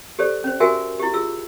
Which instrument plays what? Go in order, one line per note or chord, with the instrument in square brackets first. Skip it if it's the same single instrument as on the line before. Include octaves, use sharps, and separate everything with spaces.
[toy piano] G4 A4 C5 D5
C#4 C5
D#4 F#4 G4 A#4 E5 G#5
E4 G4
F4 G#4 E6